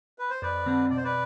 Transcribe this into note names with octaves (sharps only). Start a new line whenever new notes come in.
B4
C5
F2 B4 D5
D3 G3 C4
B2 D5
C5
B4 D5